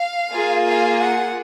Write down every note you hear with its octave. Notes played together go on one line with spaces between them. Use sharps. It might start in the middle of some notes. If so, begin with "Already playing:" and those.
Already playing: F5
A#3 F4 G#4
F5
F#5